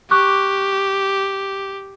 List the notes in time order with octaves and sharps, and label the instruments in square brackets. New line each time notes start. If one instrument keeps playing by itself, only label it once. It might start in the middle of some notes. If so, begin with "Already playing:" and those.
[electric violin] G4 [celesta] C#6 D6 F#6